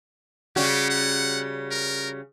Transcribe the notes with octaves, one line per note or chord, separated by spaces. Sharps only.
C#3 G3 F#4 G4
F#5
A#4